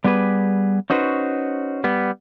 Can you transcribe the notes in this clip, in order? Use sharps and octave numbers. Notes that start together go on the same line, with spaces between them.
G3 B3 G4 G#4 B4
C#4 D#4 F#4 B4 C5
G3 B3